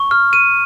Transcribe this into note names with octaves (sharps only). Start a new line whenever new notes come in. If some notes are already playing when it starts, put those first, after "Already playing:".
Already playing: C#6
F6
D#7